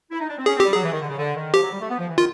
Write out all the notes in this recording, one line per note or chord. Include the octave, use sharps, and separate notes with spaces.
E4
D#4
D4
C4
C#4 G#4
C4
G3 G4
F#3 G#4
E3
D#3
D3
C#3
D3
D#3
F3 G4
F#3
G3
A3
B3
F3
E3
D#3 F4